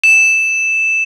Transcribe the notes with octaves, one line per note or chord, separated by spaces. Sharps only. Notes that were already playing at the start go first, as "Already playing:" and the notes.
E7